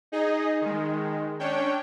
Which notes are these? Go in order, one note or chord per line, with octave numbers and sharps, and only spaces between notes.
D#4 G#4 D#5
D#3 G#3
C#4 D4 C#5 G5